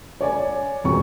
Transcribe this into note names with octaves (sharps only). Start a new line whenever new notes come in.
C#5 D5 G#5
E1 F2 C#6